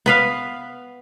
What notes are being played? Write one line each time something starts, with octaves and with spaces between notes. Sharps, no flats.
B3 B4 F5